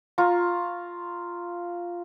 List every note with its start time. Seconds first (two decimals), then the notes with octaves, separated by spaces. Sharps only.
0.18 F4 A#5 C#6